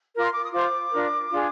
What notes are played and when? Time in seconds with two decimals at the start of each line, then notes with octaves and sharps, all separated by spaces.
0.14 F4 A#4 D6
0.23 C6
0.33 D6
0.42 D#6
0.53 F4 C5 D6
0.92 D4 F4 A#4
1.32 D4 F4 G#4